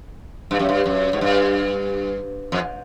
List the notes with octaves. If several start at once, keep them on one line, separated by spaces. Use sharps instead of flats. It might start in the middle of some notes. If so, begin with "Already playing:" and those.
G2
F#2
G2
F#2
G#2
G2
F2